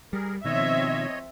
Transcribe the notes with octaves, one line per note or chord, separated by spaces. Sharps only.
G3 G#4 A#4
B2 D#3 F3 C4 C#5 D#5 E5